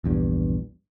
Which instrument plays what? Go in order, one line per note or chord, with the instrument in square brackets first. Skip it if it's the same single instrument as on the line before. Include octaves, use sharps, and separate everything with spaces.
[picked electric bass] A#1 E2 G2